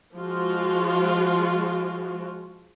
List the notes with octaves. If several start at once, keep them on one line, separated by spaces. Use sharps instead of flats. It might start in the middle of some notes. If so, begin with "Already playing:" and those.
F3 G#3 F4 F#4